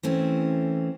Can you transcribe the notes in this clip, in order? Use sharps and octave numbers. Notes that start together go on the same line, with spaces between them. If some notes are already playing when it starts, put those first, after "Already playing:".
E3 A3 C4 C#4